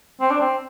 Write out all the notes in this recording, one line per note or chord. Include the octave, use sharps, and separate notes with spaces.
C4
D4
C4